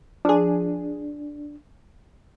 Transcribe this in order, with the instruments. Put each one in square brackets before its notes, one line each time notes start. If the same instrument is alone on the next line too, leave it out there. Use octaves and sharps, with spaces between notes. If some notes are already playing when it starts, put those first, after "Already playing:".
[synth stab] F3 G#4 [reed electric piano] D4